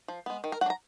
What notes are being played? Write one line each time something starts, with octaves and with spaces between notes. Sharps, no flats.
F3
G#3 B3
D#3
A#4
F#3 D4 F#5
A#5